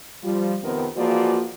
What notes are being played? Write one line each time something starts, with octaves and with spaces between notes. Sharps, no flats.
F3 G3
F2 C3 D#3 B3 C4 A#4
E3 F3 G#3 A#3 F#4 D5